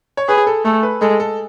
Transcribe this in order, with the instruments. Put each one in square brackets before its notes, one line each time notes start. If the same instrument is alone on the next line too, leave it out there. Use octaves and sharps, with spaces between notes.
[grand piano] C#5
[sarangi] G#4 [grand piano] B4
[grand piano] A4
[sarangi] A3 [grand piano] A4
[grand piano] B4
[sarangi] G#3 [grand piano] A4
[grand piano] A4